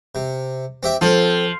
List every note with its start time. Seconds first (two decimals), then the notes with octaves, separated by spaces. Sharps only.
0.15 C3
0.83 C4 G4 E5
1.01 F3 C4 A4